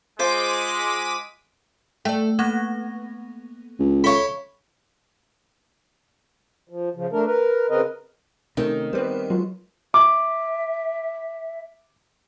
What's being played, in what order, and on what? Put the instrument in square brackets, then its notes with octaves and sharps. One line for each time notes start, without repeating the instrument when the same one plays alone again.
[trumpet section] G#3 [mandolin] F4 C5 [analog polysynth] D6 B6 D#7
[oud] A3 [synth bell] D5 G5
[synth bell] A#3 C#6 A#6 [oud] B3
[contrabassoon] C#2
[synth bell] A4 E5 F5 [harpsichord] C#5 B5
[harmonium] F3
C#3 F3
A3 D4 A#4
A#4 B4
C#3 C4 A#4 B4 D#5
[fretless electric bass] C3 A3 C#4 [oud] D#3 [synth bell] D#4
[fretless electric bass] G3 C4 [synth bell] B3 B4 C5
[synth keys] F#3 F4 [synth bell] G#3
[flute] E5 [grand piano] D6